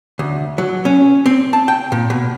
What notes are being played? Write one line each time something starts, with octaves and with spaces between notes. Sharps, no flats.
D2
F#3
C#4
C4
A5
G5
A#2
B2